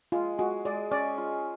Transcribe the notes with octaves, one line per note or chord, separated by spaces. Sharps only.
G#3 F4
G#3 F#4
G#3 D5
C#4 D5
F4